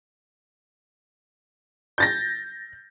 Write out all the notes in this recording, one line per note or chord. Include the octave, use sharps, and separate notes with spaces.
G6 A6 A#6